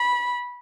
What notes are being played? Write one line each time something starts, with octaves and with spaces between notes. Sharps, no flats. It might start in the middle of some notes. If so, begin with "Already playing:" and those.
Already playing: B5